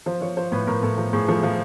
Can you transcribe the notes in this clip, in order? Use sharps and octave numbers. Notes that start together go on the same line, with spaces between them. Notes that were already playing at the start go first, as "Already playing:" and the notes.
F3 C5
F3 C#5
F3 C5
A2 B4
A2 A#4
A2 A4
F3
A2 G#4
F3 A4
F3